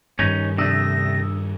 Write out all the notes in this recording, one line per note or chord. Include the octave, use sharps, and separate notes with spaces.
G2 D#3 G3 C#4 D#4
C3 A3 D4 D#6 E6 A#6